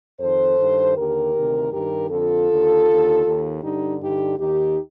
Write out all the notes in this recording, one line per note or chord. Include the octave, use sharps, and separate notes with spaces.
F2 D#3 A4 C5
G2 D#3
D#2 D3 G4 A#4
D2 C3 D#3
G2 D#3 G4 A#4
F2 D3 F4 A4
D#2 D3
D#2 D3
D#2 D#3
G2 D3 D#4 G4
G2 D3 D#4 G4
D#2 D#3 D#4 G4